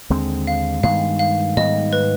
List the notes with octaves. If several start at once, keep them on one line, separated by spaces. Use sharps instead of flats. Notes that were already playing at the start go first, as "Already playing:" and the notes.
D#2 D3 G#3 C4
F5
G2 D#3 G#3 B3 F5
F5
G#2 D#3 G3 B3 D#5
B4